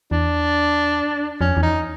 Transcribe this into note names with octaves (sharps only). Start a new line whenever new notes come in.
E2 D4
F2 C#4
E2
D#4